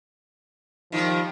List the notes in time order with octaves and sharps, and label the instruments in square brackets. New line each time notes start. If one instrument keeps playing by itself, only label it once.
[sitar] D#3 G3 [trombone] F3